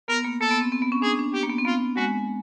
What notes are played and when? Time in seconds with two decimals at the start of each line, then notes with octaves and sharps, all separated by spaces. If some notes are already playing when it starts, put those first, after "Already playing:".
0.08 B3 A#4
0.24 A#3
0.41 A#3 A4
0.51 B3
0.61 C4
0.72 C4
0.82 B3
0.92 C#4
1.02 D4 G#4
1.19 D4
1.34 G4
1.43 A#3
1.49 B3
1.58 C4
1.65 B3 F4
1.96 G#3 F#4